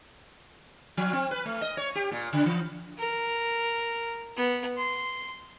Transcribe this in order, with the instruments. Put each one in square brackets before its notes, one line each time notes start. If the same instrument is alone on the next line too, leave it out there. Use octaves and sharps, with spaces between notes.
[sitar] F3
C4
B4
A3
D#5
C#5
G4
A#2
C#3
E3
[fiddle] A#4
B3
C6